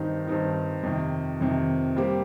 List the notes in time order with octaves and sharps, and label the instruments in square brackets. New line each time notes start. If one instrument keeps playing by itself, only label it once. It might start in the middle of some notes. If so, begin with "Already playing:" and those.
Already playing: [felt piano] G2 D#3 C4 D#4
G2 D#3 C4 D#4
F2 C3 D#3
F2 C3 D#3
G3 A#3 G4 C5